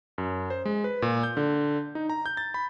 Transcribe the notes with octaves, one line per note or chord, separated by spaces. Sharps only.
F#2
C5
G#3
B4
A#2
G6
D3
D#4
A#5
G6
A6
B5